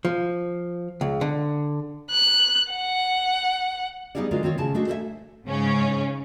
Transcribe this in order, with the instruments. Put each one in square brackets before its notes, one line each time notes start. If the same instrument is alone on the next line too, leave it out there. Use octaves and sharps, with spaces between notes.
[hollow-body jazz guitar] F3
C#2
D3
[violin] F#6
F#5
[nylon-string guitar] G3 B3 D#4 F4 G#4 D5
D2 D3 G#3 F4 F#4 A#4
D#3 C4 F4 C#5
A2 C#3 G#5 A5
G#3 A3 D4 F#4 C5
A4 B4 C5 D#5 E5 G#5
[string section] G#2 C#3 C#4